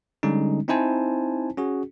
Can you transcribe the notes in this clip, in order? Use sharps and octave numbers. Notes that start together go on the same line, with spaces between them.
D3 G3 G#3 C#4 D#4
C4 D#4 E4 C5 G#5 A5
C#4 F#4 G#4